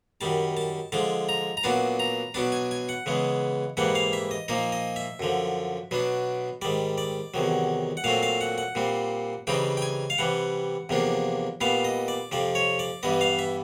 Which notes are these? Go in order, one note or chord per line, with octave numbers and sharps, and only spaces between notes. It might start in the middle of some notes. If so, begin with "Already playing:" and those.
F#2 D#3 G3 A5
A5
D3 F3 G#3 A5
A#5
A#5
A#2 F#3 B3 D4 A5
A#5
B2 F#3 B3 D4 A5
G#5
G#5
F#5
C#3 E3 G#3 B3
G#2 E3 G3 A#3 F#5
F5
E5
D#5
A#2 F3 A#3 D#4 D#5
D#5
E5
F#2 D3 F3
B2 F#3 B3 D4
G#2 D#3 G3 D5
D5
E2 C3 D#3 F#3
F#5
A#2 F#3 A3 C4 F5
F5
F#5
F#5
A#2 G3 C4
C#3 E3 G3 C4 D#4 G5
G5
G#5
F5
C3 E3 G3 F#5
E2 C3 F3 A#3 D4
A#2 G3 B3 F5
D#5
D5
F2 C3 F3 D5
C#5
D5
G2 E3 G3 B3 D#5
F5
E5